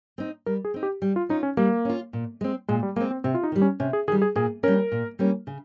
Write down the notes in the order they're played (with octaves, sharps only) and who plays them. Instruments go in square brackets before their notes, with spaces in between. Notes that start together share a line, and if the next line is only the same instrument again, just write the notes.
[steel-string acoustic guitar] C4 D#4
[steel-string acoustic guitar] G3 [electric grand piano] A#4
[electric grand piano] G#4
[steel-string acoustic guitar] C4 D#4
[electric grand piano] G4
[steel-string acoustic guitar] G3
[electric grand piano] F4
[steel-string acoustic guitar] C#4 F4 [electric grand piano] D#4
[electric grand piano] C#4
[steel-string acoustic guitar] G3 [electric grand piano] A#3
[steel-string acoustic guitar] C#4 F4
A#2
G#3 C4
[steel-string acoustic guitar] A#2 [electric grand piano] G#3
[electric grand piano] G3
[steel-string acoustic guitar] G#3 [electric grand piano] A#3
[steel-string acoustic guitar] C4
[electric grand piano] C4
[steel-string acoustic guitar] C3 [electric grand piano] C4
[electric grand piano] F4
D#4
[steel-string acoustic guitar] D#3 G3
[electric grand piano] C#4
[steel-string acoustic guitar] C3 [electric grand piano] C#4
[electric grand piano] G#4
[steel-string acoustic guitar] D#3 [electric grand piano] G#4
[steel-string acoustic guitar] G3
[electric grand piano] G#4
[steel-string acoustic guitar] A#2 [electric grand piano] G#4
[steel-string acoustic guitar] G3 A#3 C#4 [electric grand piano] A#4
[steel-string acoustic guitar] A#2
G3 A#3 C#4
C#3